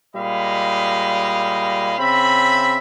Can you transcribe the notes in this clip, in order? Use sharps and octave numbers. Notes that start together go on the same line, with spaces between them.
A#2 G3 G#3 D#5 F5 B5
C#3 C4 E5 B5